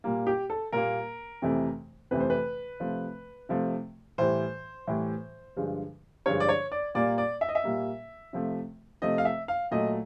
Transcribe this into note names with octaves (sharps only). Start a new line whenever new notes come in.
A#2 G3 A#3
G4
A4
A#2 G3 A#3 A#4
F2 C3 E3 A3
F2 C3 E3 A3 B4
C5
B4
C3 F3 A3
C3 F3 A3
A2 E3 G3 C5
A2 E3 G3
G2 D3 F3 G#3
G2 D3 F3 G#3 C#5
D5
C#5
D5
A#2 G3 A#3 D5
D5
E5
D#5
E5
A#2 G3 A#3
C3 F3 A3
C3 F3 A3 D#5
F5
E5
F5
A#2 F#3 A3 D#5